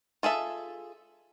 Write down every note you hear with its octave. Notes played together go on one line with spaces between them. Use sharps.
F4 G#4 A4 E5